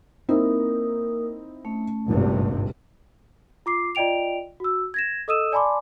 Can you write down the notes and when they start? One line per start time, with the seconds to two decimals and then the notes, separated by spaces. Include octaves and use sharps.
0.29 A#3 C4 D#4 E4 A#4 D#6
1.65 A3 C#4
2.08 D#1 G#1 G2 C3
3.66 F4 D6 C7
3.95 F4 D5 D#5 G5 D7 F7
4.60 F#4 E6
4.94 G#6 A#6 E7
5.28 A4 D#5 D#6 E6 D#7 E7
5.52 D5 G#5 A5 B5 C6 D6